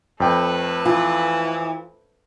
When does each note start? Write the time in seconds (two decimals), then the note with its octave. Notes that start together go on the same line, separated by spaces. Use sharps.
0.20 F2 A3 B4 G5
0.85 E3 F4